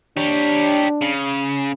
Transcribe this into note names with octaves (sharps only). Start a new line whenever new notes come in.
D4 G4 C#5
C#3